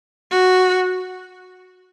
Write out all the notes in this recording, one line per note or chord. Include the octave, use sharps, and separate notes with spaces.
F#4